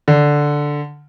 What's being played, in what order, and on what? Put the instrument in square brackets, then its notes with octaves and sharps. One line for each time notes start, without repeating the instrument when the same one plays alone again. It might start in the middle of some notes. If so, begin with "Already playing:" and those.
[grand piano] D3